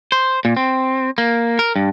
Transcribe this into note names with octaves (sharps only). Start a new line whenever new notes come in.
C5
A#2
C4
A#3
A#4
G2